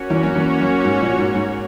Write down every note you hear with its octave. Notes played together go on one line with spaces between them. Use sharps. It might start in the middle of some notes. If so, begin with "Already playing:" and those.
Already playing: A#3 C#4 F#4 C#5
E2 E3
F#2 F#3
E2 E3
F#2
G#2
A#1 A#2
G#2
G#2